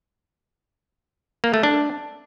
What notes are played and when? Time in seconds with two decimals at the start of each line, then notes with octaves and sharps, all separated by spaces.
1.44 A#3
1.54 A3
1.63 D4